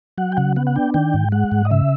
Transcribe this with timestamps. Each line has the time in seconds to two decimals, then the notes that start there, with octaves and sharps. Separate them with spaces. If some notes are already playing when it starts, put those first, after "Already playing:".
0.18 F#3 F#5
0.32 G5
0.37 C#3 F#5
0.56 B3 F#5
0.67 F#5
0.76 D4 G5
0.94 D#3 G5
1.14 G#2
1.32 G#3 F#5
1.52 G#2
1.65 D#5
1.71 C#3 E5